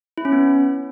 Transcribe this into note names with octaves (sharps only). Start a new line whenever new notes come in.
E4
C#4
B3